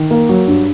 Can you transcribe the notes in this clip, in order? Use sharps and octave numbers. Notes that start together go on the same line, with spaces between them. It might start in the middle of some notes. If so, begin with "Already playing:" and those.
Already playing: D#3
A#3
F#3
G2